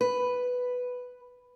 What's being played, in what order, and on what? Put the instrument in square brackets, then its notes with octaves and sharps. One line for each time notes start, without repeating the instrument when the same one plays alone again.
[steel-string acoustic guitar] B4